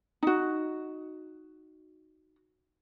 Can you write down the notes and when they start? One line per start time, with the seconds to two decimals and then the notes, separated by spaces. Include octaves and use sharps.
0.23 D#4 F#4